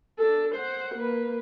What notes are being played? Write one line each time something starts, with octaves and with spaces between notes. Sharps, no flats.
D4 A4
C5 F#5
A#3 B4